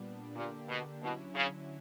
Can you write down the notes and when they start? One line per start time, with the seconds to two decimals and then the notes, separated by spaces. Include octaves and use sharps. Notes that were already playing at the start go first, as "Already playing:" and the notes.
Already playing: A#2 G3 B3 D4
0.35 A#2 D3 A#3 D4 G4
0.69 B2
1.01 B2 D3 F#3 C#4 E4
1.35 C#3